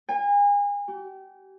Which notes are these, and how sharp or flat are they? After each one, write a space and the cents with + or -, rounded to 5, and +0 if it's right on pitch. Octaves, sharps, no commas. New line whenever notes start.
G#5 -35
G4 -35